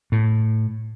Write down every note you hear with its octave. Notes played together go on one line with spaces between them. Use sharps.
A2